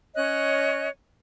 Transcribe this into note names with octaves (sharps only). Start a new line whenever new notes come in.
C#4 C#5 D#5 F#6